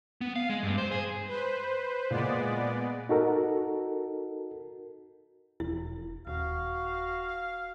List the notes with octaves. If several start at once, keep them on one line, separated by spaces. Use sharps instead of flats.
B3
F5
G#3
G2
C5
G#4
B4 C5
A#2 G#3 B3 D5
D#4 F#4 A4 A#4
E1 E4
D#1 F#4 F5